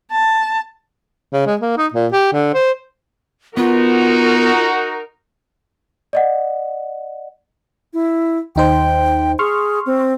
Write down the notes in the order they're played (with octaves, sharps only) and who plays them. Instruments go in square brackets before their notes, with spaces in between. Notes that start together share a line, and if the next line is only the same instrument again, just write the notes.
[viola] A5
[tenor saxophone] C#3
G#3
A#3
D#4
A#2
G4
D3
C5
[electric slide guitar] B3 B4 [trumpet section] D#4 F#4 [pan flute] F4 [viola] A#4
[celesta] D5 D#5 F#5
[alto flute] E4
[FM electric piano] D#2 D#4 C5 [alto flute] G5
[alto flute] G#4 [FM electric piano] C6 C#6 F6
[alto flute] C4